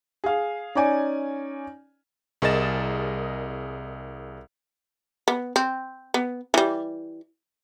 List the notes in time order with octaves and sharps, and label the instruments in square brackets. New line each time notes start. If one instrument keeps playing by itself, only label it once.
[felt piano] G#4 F5
C#4 D#4 D5 G#5
[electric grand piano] C2 G#4 A#4 D#5 A6 E7
[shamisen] B3
C4
B3
E3 G3